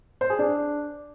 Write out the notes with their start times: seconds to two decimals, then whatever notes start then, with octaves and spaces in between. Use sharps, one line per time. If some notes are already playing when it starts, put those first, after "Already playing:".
0.21 C5
0.30 G#4
0.39 D4